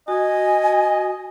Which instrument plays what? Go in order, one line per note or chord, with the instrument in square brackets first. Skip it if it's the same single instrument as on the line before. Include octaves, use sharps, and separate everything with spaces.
[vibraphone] F#4 [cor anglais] D#5 [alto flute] G#5